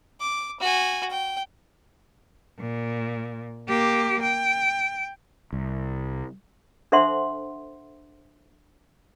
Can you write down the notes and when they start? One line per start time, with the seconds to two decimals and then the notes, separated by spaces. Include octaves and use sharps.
0.20 D6
0.60 F#4 G#5
1.10 G5
2.60 A#2
3.68 A#3 G4
4.22 G5
5.53 C2
6.92 D4 A4 C5 E5 F#5 C6